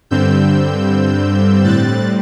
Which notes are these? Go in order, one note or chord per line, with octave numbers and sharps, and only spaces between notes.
G2 D3 G3 C4 E6 G6
A2 G3 C4 F#6 A6